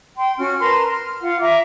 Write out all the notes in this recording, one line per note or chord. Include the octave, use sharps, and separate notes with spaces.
G5 C6
C#4 F#4 F6
A#4 B4 A5 C6
F6
F4 F#5
E5 A#5 D6